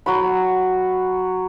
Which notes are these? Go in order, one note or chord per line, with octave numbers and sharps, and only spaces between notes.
F#3 F#4 B5